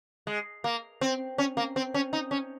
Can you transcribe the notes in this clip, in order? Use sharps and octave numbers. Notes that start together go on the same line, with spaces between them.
G#3
A#3
C4
C#4
A#3
C4
C#4
D#4
C#4